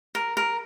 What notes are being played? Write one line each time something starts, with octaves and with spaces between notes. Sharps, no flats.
A#4
A#4